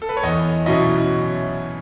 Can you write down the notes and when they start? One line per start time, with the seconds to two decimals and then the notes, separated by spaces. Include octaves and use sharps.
0.02 A4
0.09 B4
0.17 C#5
0.23 E2 D#5
0.66 B2 F#3 C#4 E4 D#5